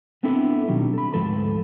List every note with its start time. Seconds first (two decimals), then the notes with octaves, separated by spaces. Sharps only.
0.23 B3 C4 D4 E4 A4
0.68 B2 D#3 F#3 G3
0.93 A4 B5
1.13 D2 G#2 F3 A4 B4 B5